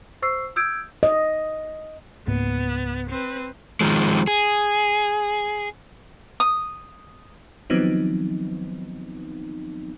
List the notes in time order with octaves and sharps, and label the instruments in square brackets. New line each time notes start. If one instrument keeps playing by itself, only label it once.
[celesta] C5 C#6 E6 C7
D#6 E6 G6 G#6 D7
[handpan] D#5
[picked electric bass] C#2 G#2 A#3 [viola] B3
[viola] C4 B4
[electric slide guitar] D#3 F3 G#3
G#4
[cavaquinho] D#6
[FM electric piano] D#3 F3 F#3 B3 C4 D#4